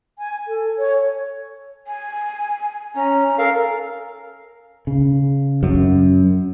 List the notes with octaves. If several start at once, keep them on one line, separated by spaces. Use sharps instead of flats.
G#5
A4
C#5
G#5
C#4 A#5
A4 A#4 F5
C#3
F#2